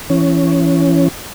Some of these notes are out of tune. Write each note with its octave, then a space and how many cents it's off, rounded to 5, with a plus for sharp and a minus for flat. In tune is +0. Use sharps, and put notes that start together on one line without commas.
E3 +25 C#4 +0